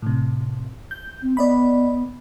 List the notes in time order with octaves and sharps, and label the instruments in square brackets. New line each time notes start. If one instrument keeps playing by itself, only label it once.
[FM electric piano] A2 C3
G6
[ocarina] C4
[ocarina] B3 [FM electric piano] D5 D#5 B5